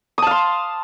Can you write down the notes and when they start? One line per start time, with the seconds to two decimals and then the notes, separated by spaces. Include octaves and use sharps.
0.18 D#6
0.22 A5
0.27 F5
0.31 C6